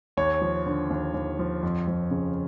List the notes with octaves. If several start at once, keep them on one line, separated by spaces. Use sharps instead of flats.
D#2 C#5
F3
D3
D#2
D#2
F3
F2
F3
C#3